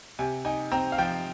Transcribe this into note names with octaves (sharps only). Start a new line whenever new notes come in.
C3 G#5
D#4 G#5
C4 A#5
F5
F3 G5